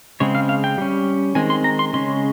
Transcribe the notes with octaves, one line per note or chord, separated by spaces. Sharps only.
C#3 G#3 C4 C#5
F5
F5
G5
G3 C#4
D#3 G#3 C4 G#5
C6
A#5
C6
C#3 G#3 C#4 C6